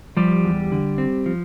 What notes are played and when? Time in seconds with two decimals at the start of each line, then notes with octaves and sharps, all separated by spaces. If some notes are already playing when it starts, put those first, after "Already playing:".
0.17 F3 G3 G4
0.44 E2
0.72 D3
0.98 C4
1.26 F3